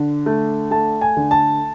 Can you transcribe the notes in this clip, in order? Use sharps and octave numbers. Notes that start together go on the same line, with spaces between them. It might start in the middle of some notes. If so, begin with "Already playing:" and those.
Already playing: D3
A3
A3 A5
G#5
D3
A5